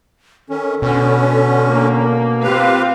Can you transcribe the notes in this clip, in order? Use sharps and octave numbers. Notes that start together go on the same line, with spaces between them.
D#3 C#4 A4
B2 D3 C#4
A#3
C4 F4 G4 B4 F5